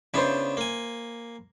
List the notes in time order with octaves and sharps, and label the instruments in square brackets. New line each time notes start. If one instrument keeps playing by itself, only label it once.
[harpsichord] C#3 B3 D4 [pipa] E4 F4 C5
[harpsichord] A#3 G#5